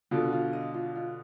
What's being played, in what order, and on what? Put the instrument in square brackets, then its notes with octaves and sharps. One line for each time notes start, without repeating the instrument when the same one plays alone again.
[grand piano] B2 D3 [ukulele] F4
[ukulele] F4
D#5
F4
F4